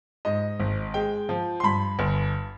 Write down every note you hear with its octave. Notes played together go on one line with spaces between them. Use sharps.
G#2 D#5
G#1
G#3 G5
F3
C6
G2 B5
G1